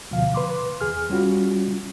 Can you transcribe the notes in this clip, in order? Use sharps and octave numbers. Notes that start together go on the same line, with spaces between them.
D2 B2 D3 F3 F5
B4 C6 D6
E2 G#4 F6
G3 C#4 F4 F#4